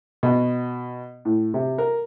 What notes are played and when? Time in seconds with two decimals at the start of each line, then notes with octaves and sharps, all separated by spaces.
0.23 B2
1.25 A2
1.54 C3
1.78 A#4